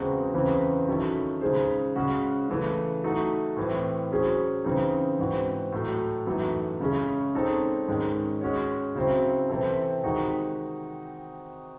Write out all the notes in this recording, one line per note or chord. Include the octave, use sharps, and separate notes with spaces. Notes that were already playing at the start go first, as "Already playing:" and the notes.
Already playing: E2 C#3 G#3 C4 F#4
E2 C#3 E3 C4
D#3 F#3 C#4 E4 A4
C#3 G#3 D#4 G#4 C5
C#3 G#3 C#4 F#4
C#3 E3 A3
F#3 A3 D#4 F#4
A2 E3 C4 E4
F#3 C#4 G#4 C5
C#3 E3 C4 D#4
G#2 E3 C4 F#4
A2 F#3 A3
F#2 E3 A3 D#4 F#4
C#3 G#3 C#4 G#4
G#3 C4 D#4 A4 C#5
G#2 D#3 G#3 C#4
G#3 C#4 F#4 C#5
C#3 F#3 C4 E4
C3 E3 C4 E4 A4
C3 D#3 G#3 D#4 F#4